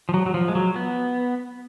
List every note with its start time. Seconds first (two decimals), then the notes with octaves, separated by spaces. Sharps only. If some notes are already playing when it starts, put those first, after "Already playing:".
0.09 F3
0.14 F#3
0.26 F#3
0.34 F3
0.48 G#3
0.55 F#3
0.76 B3